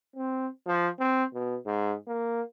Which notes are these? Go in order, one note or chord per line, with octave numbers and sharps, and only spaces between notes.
C4
F3
C4
B2
G#2
A#3